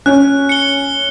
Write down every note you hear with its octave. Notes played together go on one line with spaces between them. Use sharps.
C#4 F#6
C#7 G7